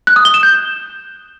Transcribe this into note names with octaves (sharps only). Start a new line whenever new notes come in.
F#6
D#6
G7
E7
G6